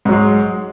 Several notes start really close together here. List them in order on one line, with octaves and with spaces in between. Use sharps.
G#2 F#3 G#3